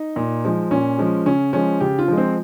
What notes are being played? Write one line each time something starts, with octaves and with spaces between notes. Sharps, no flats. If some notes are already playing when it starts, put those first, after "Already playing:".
Already playing: D#4
A#2
F3 G#3
A#2 C#4
F3 G#3
C#3 C#4
F3 G#3 C#4
C#3 G4
F4
F3 G#3
C4